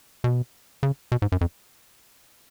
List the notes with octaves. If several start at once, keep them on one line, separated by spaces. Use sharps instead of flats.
B2
C#3
B2
G#2
F#2
F2